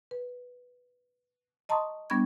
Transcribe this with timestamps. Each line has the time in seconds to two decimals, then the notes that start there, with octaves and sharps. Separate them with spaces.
0.11 B4
1.69 D#5 A5 A#5 C6 C#6 D#6
2.10 G3 B3 D4 B5 C#6 G#6